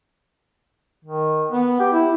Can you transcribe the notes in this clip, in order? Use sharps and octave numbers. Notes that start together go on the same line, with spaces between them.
D#3
B3
G4
E4